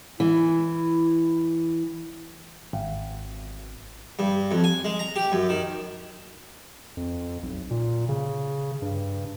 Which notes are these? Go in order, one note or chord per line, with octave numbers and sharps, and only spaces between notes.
E3 E4
G#1
G2
F2
G#5
G#3
A#5
G4
F#2
D#3
F2
B1
A#2
C#3
G2